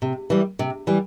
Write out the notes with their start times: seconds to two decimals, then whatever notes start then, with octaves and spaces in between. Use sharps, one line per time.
0.02 C3
0.30 E3 G3
0.59 C3
0.87 E3 G3